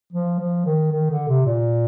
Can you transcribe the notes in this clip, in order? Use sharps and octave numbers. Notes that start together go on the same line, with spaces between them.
F3
F3
D#3
D#3
D3
C3
A#2